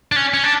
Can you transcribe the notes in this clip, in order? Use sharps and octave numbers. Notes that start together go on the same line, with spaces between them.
D4
C#4
C#4
D4